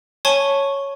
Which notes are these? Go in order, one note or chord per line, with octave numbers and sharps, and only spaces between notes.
C#5 G#5 A5 C#6 G#6 G7